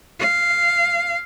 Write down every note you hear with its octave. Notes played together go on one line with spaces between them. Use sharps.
F5